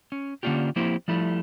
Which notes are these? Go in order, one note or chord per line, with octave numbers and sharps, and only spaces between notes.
C#4
D3 A#3 C#4 D4 F4 G4
F3 A#3 C4 E4 G4
F3 G3 A3 E4